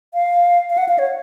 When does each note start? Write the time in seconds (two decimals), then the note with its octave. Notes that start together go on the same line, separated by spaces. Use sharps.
0.14 F5
0.70 F5
0.78 F#5
0.89 F5
0.99 C#5